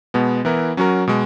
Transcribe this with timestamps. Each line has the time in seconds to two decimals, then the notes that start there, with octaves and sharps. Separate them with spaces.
0.14 B2 G#3 B3
0.45 E3 B3 E4 A#4
0.77 F#3 C#4 F#4 A#4
1.07 B2 G#3